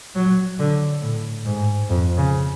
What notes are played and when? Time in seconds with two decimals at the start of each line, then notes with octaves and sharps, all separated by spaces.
0.15 F#3
0.59 D3
1.02 A2
1.45 G#2
1.89 F2
2.17 C#3